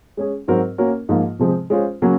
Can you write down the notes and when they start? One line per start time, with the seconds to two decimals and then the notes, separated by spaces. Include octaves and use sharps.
0.17 G#3 C#4 G#4
0.48 G#2 F#3 C4 F#4 A#4
0.78 A#3 C#4 F#4 A#4
1.09 G#2 F3 A#3 F4
1.39 C3 F3 G#3 C4
1.70 G#3 C#4 F4 C5
2.02 C#3 F#3 A#3 C#4 F#4